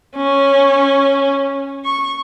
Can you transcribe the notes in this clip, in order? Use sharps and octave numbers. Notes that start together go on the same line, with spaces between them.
C#4
C#6